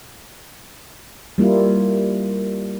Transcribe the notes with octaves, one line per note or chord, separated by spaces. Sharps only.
G3 A#3 E4 F4